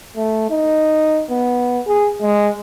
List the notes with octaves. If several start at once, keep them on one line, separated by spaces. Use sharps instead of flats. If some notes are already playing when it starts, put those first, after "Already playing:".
A3
D#4
B3
G#4
G#3